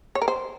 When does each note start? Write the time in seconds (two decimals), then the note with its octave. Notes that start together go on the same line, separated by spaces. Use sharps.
0.15 C#5
0.22 A#4
0.28 C5